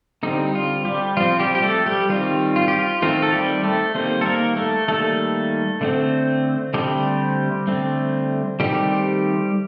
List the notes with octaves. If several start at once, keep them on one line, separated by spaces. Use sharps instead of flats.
D3 G3 C4 D#4
F4
G3 G4
F3 C4 F4
G3 G4
G4
A3 A4
G3 G4
D#3 G3 C4 F4
F4
G4
F4
D#3 A3 C4 F4
A4
G3 G4
A3 A4
D#3 G3 A#3 C4 C5
A4
A#3 A#4
A3 A4
D#3 G3 A3 A#3 A4
D3 A3 C4
D3 G3 A3 C4 G4
D3 A3 C4
D#3 G3 A3 C4 G4